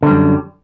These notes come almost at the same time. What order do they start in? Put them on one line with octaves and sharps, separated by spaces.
D3 G3 F#2